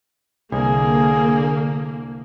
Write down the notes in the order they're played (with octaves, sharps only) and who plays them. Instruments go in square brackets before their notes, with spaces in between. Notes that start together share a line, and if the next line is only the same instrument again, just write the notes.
[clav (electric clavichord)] C2 [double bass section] D3 [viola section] A#3 [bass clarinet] G#4